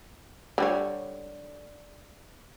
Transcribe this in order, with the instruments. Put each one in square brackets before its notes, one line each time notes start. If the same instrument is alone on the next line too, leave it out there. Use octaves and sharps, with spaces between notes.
[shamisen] D3 G3 C#5